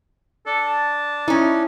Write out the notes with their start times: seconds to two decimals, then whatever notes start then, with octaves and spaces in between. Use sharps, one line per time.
0.46 D4 A4
0.66 A5
1.28 C#4 D#4 E4